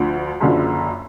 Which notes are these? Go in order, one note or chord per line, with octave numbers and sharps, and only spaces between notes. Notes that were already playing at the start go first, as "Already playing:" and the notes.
Already playing: D2 D3 F3
F#1 F#2 D3 F3